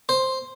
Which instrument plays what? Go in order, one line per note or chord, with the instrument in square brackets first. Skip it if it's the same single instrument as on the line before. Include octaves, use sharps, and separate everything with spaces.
[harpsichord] C5